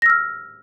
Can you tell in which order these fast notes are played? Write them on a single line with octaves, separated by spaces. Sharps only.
A#6 E6 F6